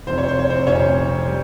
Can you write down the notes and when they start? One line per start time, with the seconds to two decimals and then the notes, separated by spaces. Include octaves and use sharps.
0.07 F1 F2 C3 C5
0.18 C#5
0.28 C5
0.39 C#5
0.49 C4 C5
0.66 F1 F2 C3 C#4 C#5
1.27 G3